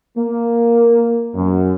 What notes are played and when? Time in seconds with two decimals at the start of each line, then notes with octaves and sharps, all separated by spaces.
0.17 A#3
1.34 F#2